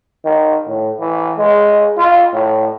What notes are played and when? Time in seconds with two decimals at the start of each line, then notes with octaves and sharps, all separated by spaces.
0.25 D#3
0.68 A2
0.99 E3
1.37 G#3
1.98 F4
2.33 A2